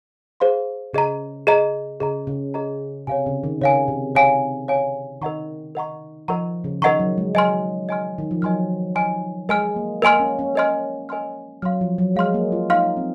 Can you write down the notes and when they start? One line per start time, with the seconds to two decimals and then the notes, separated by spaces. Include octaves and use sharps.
0.40 G#4 C5 F5 C6
0.94 C#3 G#4 D#5 A#5
1.47 G#4 D#5 A#5
2.00 C#3 G#4 D#5 A#5
2.27 C#3
2.54 G#4 D#5 A#5
3.07 C3 C#5 F5 G#5
3.26 C#3
3.43 D#3
3.61 C#3 C#5 F5 G#5
3.88 C3
4.15 C3 C#5 F5 G#5
4.68 C#5 F5 G#5
5.22 D#3 A#4 D#5 F#5 A#5 C#6
5.75 A#4 D#5 F#5 A#5 C#6
6.28 F3 A#4 D#5 F#5 A#5 C#6
6.64 C#3
6.82 D#3 A#4 D#5 F#5 A#5 C#6
7.00 F#3
7.18 G#3
7.35 F#3 D#5 G#5 C6 F6
7.89 D#5 G#5 C6 F6
8.18 D#3
8.31 F3
8.42 F#3 D#5 G#5 C6 F6
8.95 D#5 G#5 C6 F6
9.49 G#3 A#4 D#5 G#5 C6 F6
9.76 A#3
10.02 A#3 A#4 D#5 G#5 C6 F6
10.20 C#4
10.39 C#4
10.55 A#4 D#5 G#5 C6 F6
11.09 A#4 D#5 G#5 C6 F6
11.62 F#3 F5 C6 F6
11.81 F3
11.98 F#3
12.16 G#3 F5 C6 F6
12.34 A#3
12.52 F4
12.70 D#4 F5 C6 F6
12.97 C4